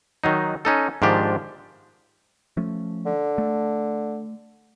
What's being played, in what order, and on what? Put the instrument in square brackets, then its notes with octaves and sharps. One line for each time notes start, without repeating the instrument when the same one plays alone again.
[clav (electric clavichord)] D#3 F#3 D#4
C#4 D#4 A4
G#2 D#3 F3 D4 G4
[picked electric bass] F3 A3 C#4
[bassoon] D3
[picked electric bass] A3